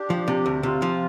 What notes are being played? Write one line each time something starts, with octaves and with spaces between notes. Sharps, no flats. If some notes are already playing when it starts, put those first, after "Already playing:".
Already playing: D4 G4
F3
C3
D2
C3 C4 F4
F3